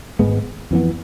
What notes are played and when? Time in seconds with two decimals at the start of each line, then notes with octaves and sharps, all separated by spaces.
0.19 G#1 G#2 G#3 B3
0.71 F2 E3 B3